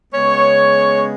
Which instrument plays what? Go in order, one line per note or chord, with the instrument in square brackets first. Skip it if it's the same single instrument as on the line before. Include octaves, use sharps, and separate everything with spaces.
[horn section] C#3 G#3 B3 C#5